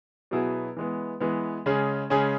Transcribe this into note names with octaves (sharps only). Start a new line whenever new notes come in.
B2 F#3 B3 E4 G#4
E3 G#3 B3
E3 G#3 B3
C#3 G#3 C#4 G#4
C#3 G#3 C#4 G#4